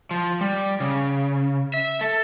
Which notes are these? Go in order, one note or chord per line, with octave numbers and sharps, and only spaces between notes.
F3
G3
C#3
E5
A4